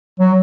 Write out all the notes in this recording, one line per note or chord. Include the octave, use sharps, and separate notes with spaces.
F#3